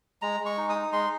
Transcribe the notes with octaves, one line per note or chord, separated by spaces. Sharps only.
G#3 A#5
G#3
C#6
D#4
D#6
D#4
G#3 C6